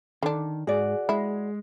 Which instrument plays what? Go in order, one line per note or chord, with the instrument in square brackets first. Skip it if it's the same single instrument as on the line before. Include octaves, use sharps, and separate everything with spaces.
[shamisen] D3 D4 [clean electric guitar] D#3
[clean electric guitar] G#2 [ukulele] F#4 D5 [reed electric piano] G#4
[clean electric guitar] G#3 [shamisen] E4